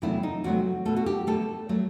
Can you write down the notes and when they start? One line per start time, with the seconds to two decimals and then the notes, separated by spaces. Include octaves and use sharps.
0.02 E2 C3 F#3 A3 E4
0.23 D#4
0.44 E2 C3 F#3 A3 F#4
0.85 B2 A3 A4
0.96 F#4
1.06 G4
1.27 B2 A3 A4
1.69 F#3 A3